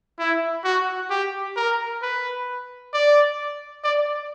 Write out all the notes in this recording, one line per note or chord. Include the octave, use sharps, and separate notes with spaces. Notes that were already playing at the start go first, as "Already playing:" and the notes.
E4
F#4
G4
A#4
B4
D5
D5